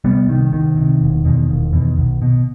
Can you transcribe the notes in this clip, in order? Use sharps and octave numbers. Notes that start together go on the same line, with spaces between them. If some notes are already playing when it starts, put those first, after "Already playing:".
C2 G3 B3
C3 D#3
C2 D#3
C3
E1
E2 B2
E1
E2 B2
B1
B2